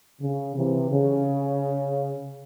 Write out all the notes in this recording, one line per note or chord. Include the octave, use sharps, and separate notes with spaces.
C#3
C3 E3
C#3